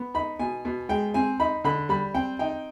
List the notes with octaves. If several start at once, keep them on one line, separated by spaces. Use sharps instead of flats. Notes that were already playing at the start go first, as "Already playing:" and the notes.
Already playing: B3
D#4 B5
B2 G#5
B2
G#3 G5
C4 G#5
D#4 B5
D3 B5
G3 B5
C4 G5
D#4 G5